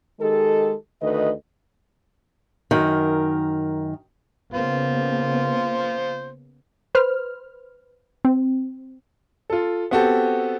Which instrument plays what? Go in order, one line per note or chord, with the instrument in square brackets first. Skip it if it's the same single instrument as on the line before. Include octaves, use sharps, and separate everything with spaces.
[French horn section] D#3 G#3 G4 A4
D2 D#3 A3 B4 D#5
[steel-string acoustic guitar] F#2 D#3 A#4
[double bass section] C#3 A#3 B3 [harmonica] F4 C5
[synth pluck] B4 C5 F6
C4
[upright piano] F4 A4
B3 C4 F#4 G4 A4